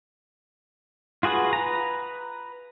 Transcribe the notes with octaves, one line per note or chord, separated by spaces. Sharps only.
F4 F#4 G#4 B4 F#5
B4 A#5